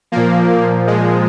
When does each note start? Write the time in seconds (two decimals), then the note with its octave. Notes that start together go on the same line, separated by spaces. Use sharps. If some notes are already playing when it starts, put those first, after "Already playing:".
0.12 A#2 F3 A#3
0.87 G#3